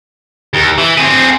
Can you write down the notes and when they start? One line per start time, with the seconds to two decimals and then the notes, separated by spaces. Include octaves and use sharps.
0.54 D#2
0.78 E3
0.97 C4 G#4